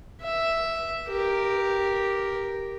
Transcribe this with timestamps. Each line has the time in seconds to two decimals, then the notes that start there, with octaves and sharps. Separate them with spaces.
0.22 E5
1.09 G4 A#4